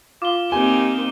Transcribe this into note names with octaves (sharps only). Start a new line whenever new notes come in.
F4 D6 G7
A#3 C4 D#4 G4 G#5